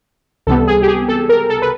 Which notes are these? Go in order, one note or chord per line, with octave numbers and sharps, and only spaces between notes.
C#2 C3 E3 G3 B3 A4
G#4
G4
G#4
A4
A#4
A4
B4